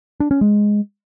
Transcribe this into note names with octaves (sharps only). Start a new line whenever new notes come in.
D4
C#4
G#3